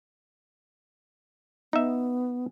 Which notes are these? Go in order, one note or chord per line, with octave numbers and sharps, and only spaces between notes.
B3 D#4 E5